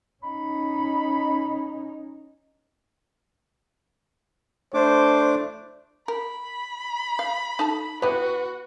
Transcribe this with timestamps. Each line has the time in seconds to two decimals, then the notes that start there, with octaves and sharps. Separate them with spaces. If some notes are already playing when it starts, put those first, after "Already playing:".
0.23 C#4 D#4 B5
4.74 A3 D4 C5 D6
6.08 A#4 B5
7.19 F5
7.59 D#4 A4 A5
8.02 B3 E4 F#4 G4 B4